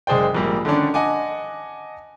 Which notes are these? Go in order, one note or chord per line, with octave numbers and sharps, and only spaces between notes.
F#1 G#3 G#4 C5 D5 G5
A#1 G#2 G3 A#3
D3 D#3 A3 C#4 D4
D#5 F#5 G#5 A5 D6